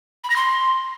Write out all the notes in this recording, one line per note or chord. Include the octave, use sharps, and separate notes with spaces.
B5
A#6
C6